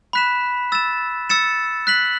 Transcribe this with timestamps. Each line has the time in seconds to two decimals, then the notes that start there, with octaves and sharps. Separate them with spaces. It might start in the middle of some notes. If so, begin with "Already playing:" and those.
0.13 B5 F#6 B6 E7
0.72 E6 A6 E7
1.29 E6 A6 C#7 E7
1.87 F#6 B6 F#7